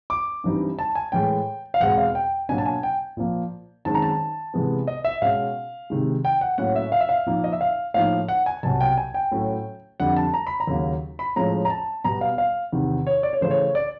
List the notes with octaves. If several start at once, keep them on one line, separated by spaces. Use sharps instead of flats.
D6
G2 E3 G3 C4 D#4
A5
G#5
A2 E3 G#3 G5
F5
E2 B2 G#3 C4 F#5
F5
G5
B2 F#3 A#3 D4 G#5
A5
G#5
G5
A#2 F3 A#3
F#2 D#3 G#3 C4 A5
A#5
A5
C3 E3 G#3 B3
D#5
E5
B2 G#3 C#4 F5
C3 D#3 G#3
G5
F#5
A2 F#3 A#3 C#4 F#5
E5
F5
E5
F5
A#2 F3 A#3 D#4
D#5
E5
F5
A2 F3 A#3 D#4 F5
F#5
G#5
C2 B2 F#3 A5
G5
G#5
G5
A2 F#3 A3 C#4
F2 D3 G3 F#5
A5
A#5
B5
A#5
D#2 C#3 F#3 A#3
B5
A2 F3 G#3 C#4 A#5
A#5
A5
B2 G3 B3 A#5
F5
F5
E2 C3 D#3
C#5
D5
C#5
C#3 E3 A3 C5
C#5
D5